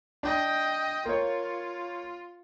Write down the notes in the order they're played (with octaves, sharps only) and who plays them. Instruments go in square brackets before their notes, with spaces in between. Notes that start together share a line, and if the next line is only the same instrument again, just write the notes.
[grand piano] D4 [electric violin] D#5 G5
[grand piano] A#3 C#5 [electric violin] F4